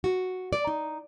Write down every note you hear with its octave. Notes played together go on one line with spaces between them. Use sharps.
F#4
D5
D#4